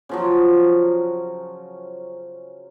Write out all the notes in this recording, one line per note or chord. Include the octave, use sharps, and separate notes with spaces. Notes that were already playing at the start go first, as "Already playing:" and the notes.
C#3 F3 F#3